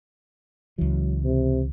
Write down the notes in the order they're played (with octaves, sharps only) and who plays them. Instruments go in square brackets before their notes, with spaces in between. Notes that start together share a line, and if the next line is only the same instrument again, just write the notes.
[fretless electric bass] C#2 E3 [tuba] F#3
[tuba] C3